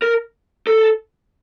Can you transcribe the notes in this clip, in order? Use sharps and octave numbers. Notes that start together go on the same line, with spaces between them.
A#4
A4